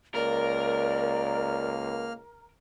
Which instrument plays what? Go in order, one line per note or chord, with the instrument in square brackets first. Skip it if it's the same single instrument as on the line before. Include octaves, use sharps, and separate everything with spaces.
[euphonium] C#2 [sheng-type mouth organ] A#3 F6 [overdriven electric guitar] A#4 [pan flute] D5